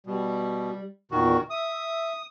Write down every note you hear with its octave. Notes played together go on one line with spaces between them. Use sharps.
B2 G3
E2 A#2 D#3 F#4
E5 D#6